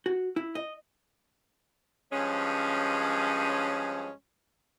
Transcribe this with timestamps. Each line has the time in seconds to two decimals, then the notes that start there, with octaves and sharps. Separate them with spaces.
0.06 F#4
0.36 E4
0.55 D#5
2.12 G2 F3 G#3 C#4